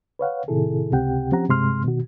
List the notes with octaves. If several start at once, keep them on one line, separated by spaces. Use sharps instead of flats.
B4 C#5 F5 F#5
A2 C3 D#3 E4 G#4 A4
C#2 C3 C4 G4 F#5 G5
F3 C4 C#4 G4 F#5 A#5
G2 C3 G#3 C6 F6
B2 D#3 F#4